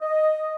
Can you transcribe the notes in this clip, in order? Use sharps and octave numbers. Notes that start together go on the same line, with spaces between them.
D#5